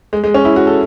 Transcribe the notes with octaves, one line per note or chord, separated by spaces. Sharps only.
G#3
G#3
C#4
E4
F#4
A4